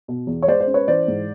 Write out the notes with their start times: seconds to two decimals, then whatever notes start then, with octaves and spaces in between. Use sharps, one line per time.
0.08 B2
0.27 E2
0.43 C#5
0.47 G#3 C5 D5
0.61 C5
0.67 C#4
0.74 B4 C#5
0.88 E3 C5 D5
1.08 G#2